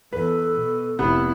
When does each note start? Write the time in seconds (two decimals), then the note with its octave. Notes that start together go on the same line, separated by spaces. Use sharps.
0.13 E2 A4 B4
0.55 B2
0.99 F1 C3 B3 E4